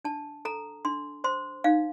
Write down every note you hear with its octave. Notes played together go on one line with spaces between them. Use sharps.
D4 A5
A4 A#5
D4 C6
C5 C6
D#4 F5